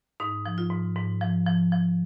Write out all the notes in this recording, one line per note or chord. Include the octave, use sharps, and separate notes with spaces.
G#2 D#4
F3
F4
G#2
G#2
F3
F3
F3